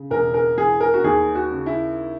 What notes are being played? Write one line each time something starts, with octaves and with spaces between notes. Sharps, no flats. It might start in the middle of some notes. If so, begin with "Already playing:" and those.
Already playing: C#3
E1 A#4
A#4
E3 G#4
A#4
F#4
D#2 G#4
F#4
C#3
E4